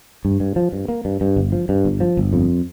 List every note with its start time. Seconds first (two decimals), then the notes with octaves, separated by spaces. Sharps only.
0.25 G2
0.40 G2
0.56 F3
0.72 G2
0.88 A#3
1.05 G2
1.21 G2
1.36 G1
1.52 F3
1.69 G2
1.85 G1
2.00 F3
2.17 G1
2.33 F2